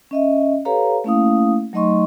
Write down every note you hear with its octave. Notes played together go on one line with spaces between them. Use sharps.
C#4 D#5 E5
G4 A4 B4 C#5 F5 A#5
A3 A#3 C#4 E4 F5 D#6
F#3 A3 D#4 D#5 C6 C#6